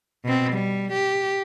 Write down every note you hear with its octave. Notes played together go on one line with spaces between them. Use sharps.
B2 C4
G3
G4